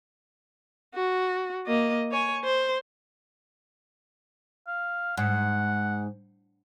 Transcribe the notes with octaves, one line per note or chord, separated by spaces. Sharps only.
F#4
A#3 D#5
C#5 G#5
C5
F5
G#2 F#5